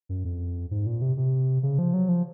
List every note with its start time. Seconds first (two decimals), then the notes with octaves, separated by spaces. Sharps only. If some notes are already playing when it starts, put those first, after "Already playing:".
0.09 F#2
0.25 F2
0.71 G#2
0.86 A#2
1.02 C3
1.17 C3
1.63 C#3
1.79 F3
1.94 F#3
2.09 F3